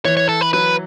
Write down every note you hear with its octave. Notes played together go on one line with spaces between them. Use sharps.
E3 C#5
C#5
A4
B4
F#3 B4